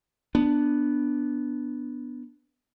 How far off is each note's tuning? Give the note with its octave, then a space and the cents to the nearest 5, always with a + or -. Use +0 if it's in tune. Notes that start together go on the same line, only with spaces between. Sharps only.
B3 +0 D4 +0